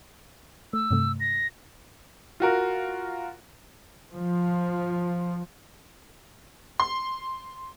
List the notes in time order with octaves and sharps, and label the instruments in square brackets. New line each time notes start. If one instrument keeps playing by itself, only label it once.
[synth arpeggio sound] A3 [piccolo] E6
[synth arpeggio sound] G2 C3 A3
[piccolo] A#6
[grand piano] F4 F#4 A#4
[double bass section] F3
[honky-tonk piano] C6